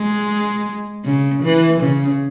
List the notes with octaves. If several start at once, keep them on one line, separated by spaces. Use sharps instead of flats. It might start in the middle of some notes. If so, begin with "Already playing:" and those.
Already playing: G#3
C#3
E3
C#3